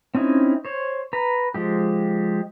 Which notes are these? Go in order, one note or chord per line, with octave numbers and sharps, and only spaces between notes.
C4 C#4 D#4 E4
C5 C#5
B4 A#5
F3 G#3 G4